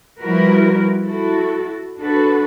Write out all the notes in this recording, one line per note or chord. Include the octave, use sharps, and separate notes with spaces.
F3 G3 E4 F#4 A#4 B4
E4 F#4 A4
D4 F#4 A4 B4